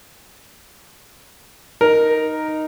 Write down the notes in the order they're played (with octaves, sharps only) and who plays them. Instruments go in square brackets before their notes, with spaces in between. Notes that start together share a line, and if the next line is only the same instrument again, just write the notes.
[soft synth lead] D#4 [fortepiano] A#4